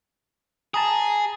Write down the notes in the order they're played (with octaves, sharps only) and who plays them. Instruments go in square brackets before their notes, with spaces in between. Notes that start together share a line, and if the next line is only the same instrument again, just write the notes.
[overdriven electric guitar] G#4 [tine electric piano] A5 A#5 D#6